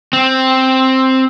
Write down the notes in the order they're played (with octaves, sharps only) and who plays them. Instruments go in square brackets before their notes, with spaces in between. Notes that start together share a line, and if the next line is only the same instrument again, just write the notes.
[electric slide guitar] C4